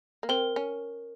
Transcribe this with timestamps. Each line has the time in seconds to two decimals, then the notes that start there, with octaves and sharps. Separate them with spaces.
0.23 A#3
0.29 C4 A#4
0.56 C#4